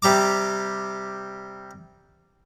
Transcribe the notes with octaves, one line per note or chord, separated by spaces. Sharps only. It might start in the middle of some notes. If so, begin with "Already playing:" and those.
C3 G3 A#5 D6